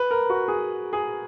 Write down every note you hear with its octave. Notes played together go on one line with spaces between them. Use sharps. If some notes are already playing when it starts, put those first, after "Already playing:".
Already playing: B4
A#4
F#4
G#4
G#4